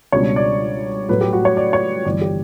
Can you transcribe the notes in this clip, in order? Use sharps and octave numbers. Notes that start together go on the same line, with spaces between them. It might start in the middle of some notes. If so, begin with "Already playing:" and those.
C#2 B2 G3 D4 C#5
D5
A2 F#3 A3 B4
G4
F#4
C#5
D5
C#5
G1 G2 E3 D5
G4